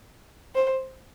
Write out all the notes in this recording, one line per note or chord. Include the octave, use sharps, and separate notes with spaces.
C5